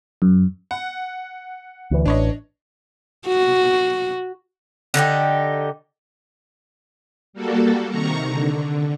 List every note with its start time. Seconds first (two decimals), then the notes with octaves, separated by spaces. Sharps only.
0.22 F#2
0.71 F#5
1.91 D2 E3
2.06 A1 D4 C#5 D#5
3.27 F#4
4.94 D3 D#4 F4 G4
7.33 G3 A#3 F#4 A4
7.90 C3 D#3 A#5 C#6
8.25 D3